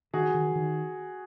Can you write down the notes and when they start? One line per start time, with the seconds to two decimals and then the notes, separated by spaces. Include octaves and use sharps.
0.13 D#3 F#4 G#4
0.34 D#3
0.55 D#3